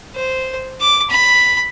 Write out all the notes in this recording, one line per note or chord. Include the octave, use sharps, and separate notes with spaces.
C5
D6
B5